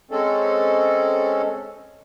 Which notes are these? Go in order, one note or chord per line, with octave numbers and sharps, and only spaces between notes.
G#3 C4 C#4 A4